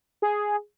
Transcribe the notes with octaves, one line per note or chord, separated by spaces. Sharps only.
G#4